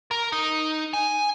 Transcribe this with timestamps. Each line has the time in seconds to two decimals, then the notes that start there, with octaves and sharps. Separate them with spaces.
0.11 A#4
0.32 D#4
0.94 G#5